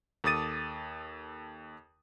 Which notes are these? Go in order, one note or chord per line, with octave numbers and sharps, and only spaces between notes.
D#2 A4 D6 D#6 A6 D#7